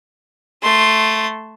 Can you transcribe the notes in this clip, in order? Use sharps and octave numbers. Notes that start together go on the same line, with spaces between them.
A3 C6